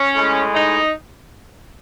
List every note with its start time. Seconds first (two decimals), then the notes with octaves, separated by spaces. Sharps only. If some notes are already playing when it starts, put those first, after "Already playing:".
Already playing: C#4
0.15 A2 G#3
0.55 D#4